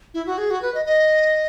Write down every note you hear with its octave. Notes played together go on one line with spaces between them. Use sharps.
E4
F#4
G#4
F#4
B4
D#5
D#5